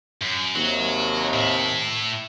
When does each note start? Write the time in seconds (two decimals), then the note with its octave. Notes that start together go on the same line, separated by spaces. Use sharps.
0.22 F#2
0.55 D#2 C3 F#3
1.34 A2 E4